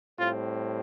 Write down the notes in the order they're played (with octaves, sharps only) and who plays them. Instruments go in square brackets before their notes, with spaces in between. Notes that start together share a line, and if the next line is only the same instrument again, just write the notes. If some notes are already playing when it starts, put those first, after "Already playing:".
[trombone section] A2 G3 C4 F4